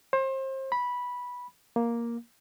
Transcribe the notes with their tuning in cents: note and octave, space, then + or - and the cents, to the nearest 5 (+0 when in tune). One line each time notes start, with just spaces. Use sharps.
C5 +30
B5 -10
A#3 +5